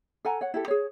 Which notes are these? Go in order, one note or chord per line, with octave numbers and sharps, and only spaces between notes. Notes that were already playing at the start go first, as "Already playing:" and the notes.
A4 F#5 G#5 A#5
C#5 F#5
E4 G4 A4
G#4 C#5